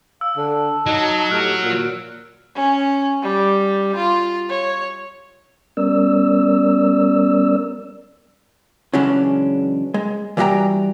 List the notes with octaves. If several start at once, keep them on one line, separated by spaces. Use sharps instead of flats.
F5 E6
D3 A5
F#3 D#4
A2 G4 F6 F#6 D7
A#2 F#4
C#4
G3
F4
C#5
G3 B3 C#4 A#4 D5 E6
C#3 E3 F#3 G#3 C#4 D4
G#3
E3 G3 F#4 D#5 G5 A#5